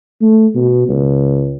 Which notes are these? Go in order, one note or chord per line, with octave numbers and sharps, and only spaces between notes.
A3
B2
C#2